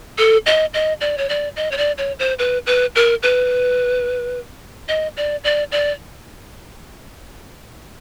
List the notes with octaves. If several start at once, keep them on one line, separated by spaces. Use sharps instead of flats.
A4
D#5
D#5
D5
C#5
D5
D#5
C#5
D5
C#5
C5
B4
B4
A#4
B4
D#5
D5
D5
D5